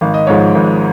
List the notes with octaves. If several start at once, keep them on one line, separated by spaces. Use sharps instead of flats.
G#1 F5
D#5
G#2 F3 G#3 C#5 F5
G#1